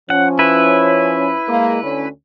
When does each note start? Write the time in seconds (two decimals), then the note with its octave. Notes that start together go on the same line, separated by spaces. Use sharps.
0.10 F3 C#4 F#5
0.39 E4 B4
1.48 G#3 A#3
1.83 D2 C#4